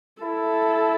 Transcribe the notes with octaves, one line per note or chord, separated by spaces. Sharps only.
E4 A4